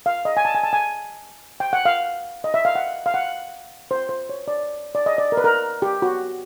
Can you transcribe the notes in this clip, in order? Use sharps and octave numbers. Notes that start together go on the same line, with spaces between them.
F5
D#5
G#5
A5
G#5
A5
G#5
G5
F#5
F5
D#5
E5
F5
F#5
F5
F#5
C5
C5
C#5
D5
D5
D#5
D5
A#4
B4
A#4
G4
F#4